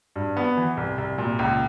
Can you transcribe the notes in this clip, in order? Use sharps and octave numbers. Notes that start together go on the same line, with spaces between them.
G2
B3
E3
C2
C2
A#2
C#2